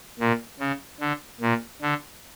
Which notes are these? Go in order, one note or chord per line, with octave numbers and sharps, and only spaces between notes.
A#2
C#3
D3
A#2
D3